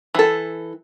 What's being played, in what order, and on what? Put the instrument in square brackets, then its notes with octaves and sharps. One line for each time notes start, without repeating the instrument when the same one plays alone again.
[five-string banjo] E3 A4